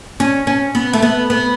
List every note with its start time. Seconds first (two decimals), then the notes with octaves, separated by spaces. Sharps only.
0.20 C#4
0.47 C#4
0.75 B3
0.93 A3
1.02 B3
1.30 B3